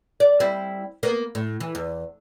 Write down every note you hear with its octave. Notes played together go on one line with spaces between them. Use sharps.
D5
G3 C4 E4
A#3 B3
A2
E3
E2